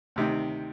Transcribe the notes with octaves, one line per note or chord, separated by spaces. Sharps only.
D2 C3 D#3